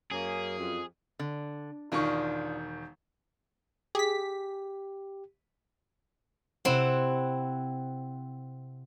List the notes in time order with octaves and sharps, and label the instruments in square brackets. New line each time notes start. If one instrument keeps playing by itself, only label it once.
[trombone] F#2 [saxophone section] A#3 C#4 [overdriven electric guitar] G#4
[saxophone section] F2
[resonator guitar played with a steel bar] D3
[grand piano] E1 D#3 C#6 [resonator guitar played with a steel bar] D4 F4
[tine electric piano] G4 [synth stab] G#4 B6
[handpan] C3 F#5 [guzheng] C4 E4